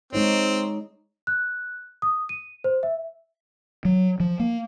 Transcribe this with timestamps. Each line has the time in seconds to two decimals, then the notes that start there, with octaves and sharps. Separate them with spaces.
0.13 G#3 C4 D#4 C#5
1.27 F#6
2.02 D#6
2.29 D#7
2.64 C5
2.83 E5
3.85 F#3
4.20 F3
4.40 A#3